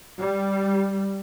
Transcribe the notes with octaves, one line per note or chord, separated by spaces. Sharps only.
G3